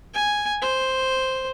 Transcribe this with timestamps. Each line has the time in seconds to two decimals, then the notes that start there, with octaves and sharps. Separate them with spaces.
0.14 G#5
0.62 C5